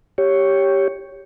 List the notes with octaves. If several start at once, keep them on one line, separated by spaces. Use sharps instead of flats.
G4 C#5